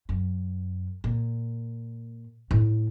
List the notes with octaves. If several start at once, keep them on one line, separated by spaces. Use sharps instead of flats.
F#2
A#2
A2 A3